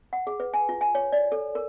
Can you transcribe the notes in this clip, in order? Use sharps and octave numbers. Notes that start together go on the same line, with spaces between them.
F#5
G#4
B4
G#5
F4
G#5
C#5
D5
A4
A#4